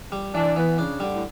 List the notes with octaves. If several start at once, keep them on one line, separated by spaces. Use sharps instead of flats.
G3
E3 D4
E3 B3
C#3 D4
D3 G3
A2